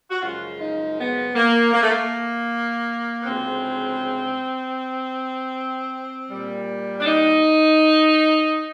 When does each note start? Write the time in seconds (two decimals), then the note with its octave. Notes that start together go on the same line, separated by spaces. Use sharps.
0.10 F#4
0.21 F#2 C#3 F3 G#3 F4
0.59 D#4
0.98 B3
1.35 A#3
1.73 A#3
1.82 A3
1.91 A#3
3.20 B3
3.25 D2 C#3 F3 G#3 C4
6.31 A#2 G3
7.00 D4
7.06 D#4